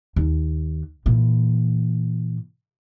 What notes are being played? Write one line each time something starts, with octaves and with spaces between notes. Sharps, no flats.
D#2
A#2 E3